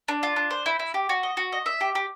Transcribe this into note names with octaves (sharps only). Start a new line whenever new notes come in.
D4
F4
D4
C5
E4
E4
G4
F#4
D#5
F#4
D#5
E5
G4
G4